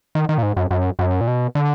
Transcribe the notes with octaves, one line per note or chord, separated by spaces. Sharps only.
D#3
D#3
A#2
G#2
F#2
F#2
F#2
A#2
B2
D3